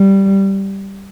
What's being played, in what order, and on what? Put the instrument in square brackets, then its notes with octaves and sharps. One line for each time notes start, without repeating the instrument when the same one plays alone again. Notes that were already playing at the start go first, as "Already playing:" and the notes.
Already playing: [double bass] G3